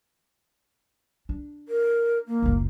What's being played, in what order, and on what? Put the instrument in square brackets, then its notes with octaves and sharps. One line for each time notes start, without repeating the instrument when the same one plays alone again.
[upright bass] D4
[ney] A#4
A#3
[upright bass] F#1 C#2